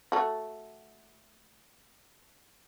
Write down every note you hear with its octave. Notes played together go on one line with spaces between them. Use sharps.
A3 F#4